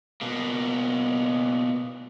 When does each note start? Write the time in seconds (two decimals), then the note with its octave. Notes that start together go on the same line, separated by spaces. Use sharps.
0.21 B2 A#3